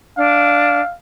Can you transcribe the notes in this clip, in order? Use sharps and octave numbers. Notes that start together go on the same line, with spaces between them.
D4 F5